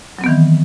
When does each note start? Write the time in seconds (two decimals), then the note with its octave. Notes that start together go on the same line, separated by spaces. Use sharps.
0.19 F#3
0.21 C4
0.24 B3
0.26 D#3
0.29 E3